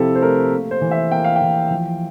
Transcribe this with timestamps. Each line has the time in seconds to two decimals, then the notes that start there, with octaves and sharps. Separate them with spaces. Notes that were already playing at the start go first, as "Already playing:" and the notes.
Already playing: C3 F3 C4 E4 G4 A4
0.15 C5
0.22 A3 A#4
0.52 A#3
0.71 C5
0.81 E3
0.91 E5
1.11 A#3 G5
1.24 F5
1.36 G5
1.41 E3
1.71 F3